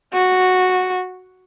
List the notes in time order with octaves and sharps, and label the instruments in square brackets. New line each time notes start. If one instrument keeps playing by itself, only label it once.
[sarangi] F#4